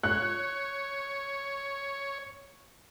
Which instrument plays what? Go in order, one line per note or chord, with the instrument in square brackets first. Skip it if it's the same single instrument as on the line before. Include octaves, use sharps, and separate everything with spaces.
[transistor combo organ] C#5 [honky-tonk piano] F#6